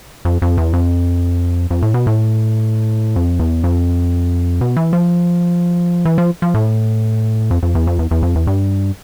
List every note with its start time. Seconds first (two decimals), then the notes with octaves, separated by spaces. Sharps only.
0.25 F2
0.42 F2
0.58 E2
0.73 F2
1.71 F2
1.82 A2
1.94 B2
2.07 A2
3.16 F2
3.40 E2
3.64 F2
4.61 B2
4.76 E3
4.93 F3
6.05 E3
6.18 F3
6.42 F3
6.54 A2
7.51 F2
7.63 F2
7.75 E2
7.87 F2
7.99 E2
8.11 E2
8.23 F2
8.35 E2
8.47 G2